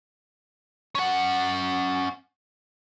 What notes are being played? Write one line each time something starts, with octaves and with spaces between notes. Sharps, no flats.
C#4 F#5